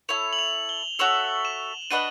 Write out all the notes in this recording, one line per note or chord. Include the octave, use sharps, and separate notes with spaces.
E4 A4 C#5 F7
F#7
F7
G7
F#4 A4 C#5 E5 F#7
E7
D4 F#4 B4 D#5 D#7